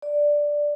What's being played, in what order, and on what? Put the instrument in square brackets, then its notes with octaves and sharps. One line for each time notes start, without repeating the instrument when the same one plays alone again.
[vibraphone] D5